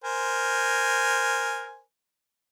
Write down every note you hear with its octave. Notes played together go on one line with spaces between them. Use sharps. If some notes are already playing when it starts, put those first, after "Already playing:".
A#4 C5 G#5